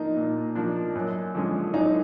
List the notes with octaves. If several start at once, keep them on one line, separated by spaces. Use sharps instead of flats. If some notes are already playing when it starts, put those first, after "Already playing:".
Already playing: F3 A#3 D4 D#4
A#2
F3 A#3 D4
F#2
D3 F3 G#3 C#4
F#2 D#4